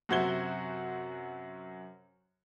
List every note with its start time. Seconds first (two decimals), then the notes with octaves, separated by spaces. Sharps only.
0.09 F#2 C3 F#4 C5 G#6 G7